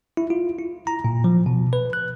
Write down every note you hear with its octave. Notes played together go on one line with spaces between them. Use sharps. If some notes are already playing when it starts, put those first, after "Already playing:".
E4
F4
E4
A#5
A#2
F3
B2
B4
F#6